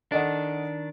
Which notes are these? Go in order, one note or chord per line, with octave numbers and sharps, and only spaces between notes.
D#3 D4 A4 D#5 F#5